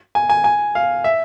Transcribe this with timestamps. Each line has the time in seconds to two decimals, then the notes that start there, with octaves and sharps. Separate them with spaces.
0.15 G#5
0.29 G#5
0.44 G#5
0.75 F5
1.04 E5